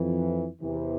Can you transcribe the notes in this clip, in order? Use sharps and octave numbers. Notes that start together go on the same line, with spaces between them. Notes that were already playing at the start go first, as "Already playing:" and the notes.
Already playing: F2 E3
E2 C3 E3